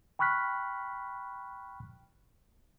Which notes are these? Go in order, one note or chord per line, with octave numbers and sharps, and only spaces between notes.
G5 B5 C#6 F6 F#6 B6